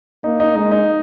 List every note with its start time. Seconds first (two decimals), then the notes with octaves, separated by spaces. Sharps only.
0.24 A#3 D#4
0.40 D#4
0.55 G#3 D#4
0.72 D#4